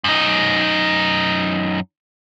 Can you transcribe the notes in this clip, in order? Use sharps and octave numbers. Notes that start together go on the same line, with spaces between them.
F#2 D#4